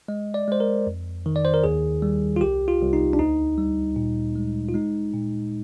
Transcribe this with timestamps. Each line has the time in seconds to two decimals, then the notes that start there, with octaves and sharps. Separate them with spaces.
0.08 G#3 D#5
0.34 D5
0.48 G#3 C5
0.60 A#4
0.87 F2
1.26 D#3
1.36 D5
1.45 C5
1.54 A#4
1.64 D#2 G#4
2.02 G3
2.36 F4
2.41 C2 G4
2.68 F4
2.81 C2
2.93 D#4
3.13 D4
3.19 D2 D#4
3.58 G3
3.96 A#2
4.36 G#3
4.68 F4
4.74 G#3 D#4
5.14 A#2